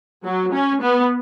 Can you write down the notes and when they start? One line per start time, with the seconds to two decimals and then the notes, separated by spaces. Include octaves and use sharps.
0.24 F#3
0.52 C#4
0.82 B3